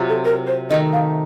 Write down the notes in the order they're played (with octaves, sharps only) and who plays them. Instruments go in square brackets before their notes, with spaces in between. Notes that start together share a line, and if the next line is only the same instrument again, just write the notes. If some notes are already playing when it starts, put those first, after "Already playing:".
Already playing: [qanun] C3 F#3 C4 F4
[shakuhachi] A4
A#4
C5
[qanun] D#3 A3 D#4 [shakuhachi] D#5
[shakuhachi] F5